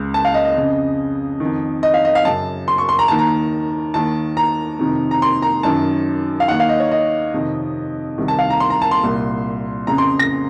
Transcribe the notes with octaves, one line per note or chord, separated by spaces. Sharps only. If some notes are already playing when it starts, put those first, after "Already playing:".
Already playing: C#2 C#3
A5
F5
D#5
D#5
F2 C#3
F2 D#3
D#5
F5
D#5
F5
F#2 C#3 A5
C6
C#6
C6
A#5
D#2 D#3 A5
A#5
D#2 D#3 A5
A#5
F2 C3 D#3
A#5
C6
A#5
F#2 D#3 A5
F5
D#2 D#3 F#5
F5
D#5
C#5
D#5
F2 C3 D#3
C2 C3 D#3
A5
F5
A#5
C6
A#5
A5
C6
C2 A#2
F2 C#3 A#5
C6
A#6